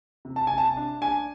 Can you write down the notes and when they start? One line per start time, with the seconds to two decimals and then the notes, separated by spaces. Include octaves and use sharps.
0.25 C3
0.36 A5
0.47 C3 G#5
0.58 A5
0.77 D4
1.01 D4 G#5